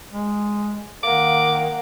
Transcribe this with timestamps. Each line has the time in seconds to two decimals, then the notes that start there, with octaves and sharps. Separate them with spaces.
0.11 G#3
1.03 D#3 A#3 F#5 D6